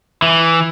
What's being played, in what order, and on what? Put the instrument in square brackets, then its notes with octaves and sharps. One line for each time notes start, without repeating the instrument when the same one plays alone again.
[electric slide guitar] E3